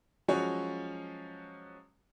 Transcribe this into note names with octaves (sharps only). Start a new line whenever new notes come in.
F3 F#3 G#3 C#4 F#4 C#5